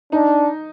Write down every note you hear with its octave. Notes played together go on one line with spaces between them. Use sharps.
D4 D#4